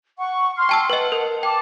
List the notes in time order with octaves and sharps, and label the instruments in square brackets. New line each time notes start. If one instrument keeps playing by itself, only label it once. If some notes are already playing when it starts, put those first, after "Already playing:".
[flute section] F#5 C#6
C6 F6
[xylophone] G5 A5 E6
[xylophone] B4 D#5 [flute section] F#5
[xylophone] A#4
[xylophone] G5 [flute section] A5 D6